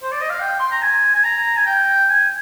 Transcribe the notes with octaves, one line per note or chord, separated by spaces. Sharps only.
C5
D5
D#5
F5
G5
C6
A#5
G#5
G#5
A#5
G#5
G5
G#5